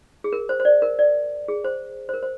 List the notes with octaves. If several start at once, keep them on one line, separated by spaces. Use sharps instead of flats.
G#4
A#4
C5
C5
D5
A#4
D5
G#4
C5
C5
A#4
C5